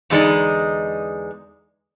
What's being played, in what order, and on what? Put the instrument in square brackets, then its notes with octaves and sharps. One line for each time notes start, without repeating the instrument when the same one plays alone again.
[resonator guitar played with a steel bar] E2 D3 G#3 D#4 D5